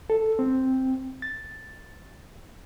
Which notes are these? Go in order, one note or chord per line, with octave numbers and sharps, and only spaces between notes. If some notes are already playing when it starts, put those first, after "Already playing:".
A4
C4
A6